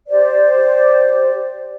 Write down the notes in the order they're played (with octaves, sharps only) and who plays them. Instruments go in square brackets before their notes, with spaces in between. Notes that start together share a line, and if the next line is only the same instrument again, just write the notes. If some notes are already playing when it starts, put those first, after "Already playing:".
[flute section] G4 C5 D5